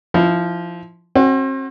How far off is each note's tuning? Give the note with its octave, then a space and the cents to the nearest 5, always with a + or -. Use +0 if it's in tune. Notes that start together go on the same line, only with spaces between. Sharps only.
F3 -10 E4 -25
C4 +40 F#4 +15